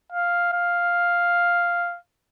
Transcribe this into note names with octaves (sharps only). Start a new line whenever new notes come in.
F5
F5